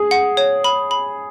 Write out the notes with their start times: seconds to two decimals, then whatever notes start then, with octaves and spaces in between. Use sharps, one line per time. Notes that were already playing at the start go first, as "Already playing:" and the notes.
Already playing: G#4
0.11 F#5
0.37 C#5
0.64 B5
0.91 B5